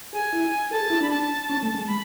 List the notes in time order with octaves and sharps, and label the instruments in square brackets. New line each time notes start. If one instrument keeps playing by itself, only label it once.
[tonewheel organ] G#4 [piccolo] G#5
[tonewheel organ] E4
[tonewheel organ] A4 [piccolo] A5
[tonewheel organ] G#4
E4
[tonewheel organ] D4 [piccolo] B5
[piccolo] A5
[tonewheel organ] C#4
A3
G#3
[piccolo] B5